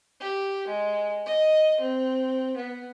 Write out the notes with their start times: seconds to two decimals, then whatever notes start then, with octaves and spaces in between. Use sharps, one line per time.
0.20 G4
0.67 G#3
1.26 D#5
1.80 C4
2.57 B3